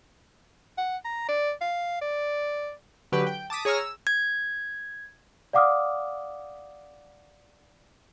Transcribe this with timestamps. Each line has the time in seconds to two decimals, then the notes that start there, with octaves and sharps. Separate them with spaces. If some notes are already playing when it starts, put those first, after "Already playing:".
0.78 F#5
1.05 A#5
1.28 D5
1.61 F5
2.01 D5
3.12 D3 F#3 G4 B4
3.27 G5
3.50 A5 D6 D#6 B6
3.65 G#4 C#5 A#5 E6 F6
3.79 E6
4.07 G#6
5.53 D5 F5 F#5 D6 D#6 F6